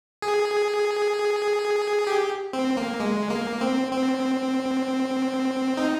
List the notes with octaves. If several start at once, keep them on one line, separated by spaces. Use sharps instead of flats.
G#4
G4
C4
A#3
G#3
A#3
C4
C4
D#4